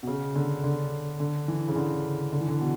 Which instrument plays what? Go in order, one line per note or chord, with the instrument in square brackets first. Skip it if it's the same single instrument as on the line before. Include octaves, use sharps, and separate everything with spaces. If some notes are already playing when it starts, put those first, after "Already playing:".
[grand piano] B2
C#3
D3
D3
D3
E3
C#3
D3
D3
E3
D3
B2